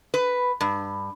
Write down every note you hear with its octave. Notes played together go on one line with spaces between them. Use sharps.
B4
G2